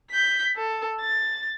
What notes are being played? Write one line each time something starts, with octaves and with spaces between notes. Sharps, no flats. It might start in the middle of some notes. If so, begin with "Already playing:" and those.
G6 B6
A4
A6